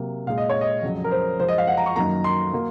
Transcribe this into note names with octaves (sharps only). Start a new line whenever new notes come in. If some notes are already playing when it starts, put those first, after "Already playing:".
Already playing: C3 F#3 A#3
A#2 G#3 F5
D#5
C#5
D#5
F2 C#3 F#3
A#4
C5
F#2 F3 G#3 C5
D#5
F5
F#5
A#5
C#6
F#2 D#3 F#3 A#3 A#5
C6
F#3 A#3